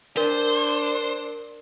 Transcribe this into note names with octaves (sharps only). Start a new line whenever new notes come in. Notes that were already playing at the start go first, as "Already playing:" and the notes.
D4 A#4 C5